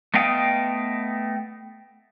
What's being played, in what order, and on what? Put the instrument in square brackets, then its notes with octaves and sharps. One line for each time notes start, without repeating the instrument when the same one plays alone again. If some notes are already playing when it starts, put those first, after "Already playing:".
[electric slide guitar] A3 B3 D#5 F5 G5